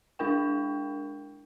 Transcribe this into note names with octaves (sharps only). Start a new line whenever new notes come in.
G#3 D4 E4 A#4 G5